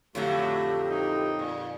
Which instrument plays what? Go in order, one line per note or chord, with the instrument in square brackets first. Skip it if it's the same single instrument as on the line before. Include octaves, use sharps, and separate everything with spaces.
[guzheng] F2 D3 A#5 [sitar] A2 F#3 [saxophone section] A3 [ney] G4
[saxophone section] A#3 C4 D#4
[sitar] A#2